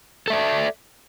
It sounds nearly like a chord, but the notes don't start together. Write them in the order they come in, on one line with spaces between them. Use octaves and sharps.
A4 E5 D5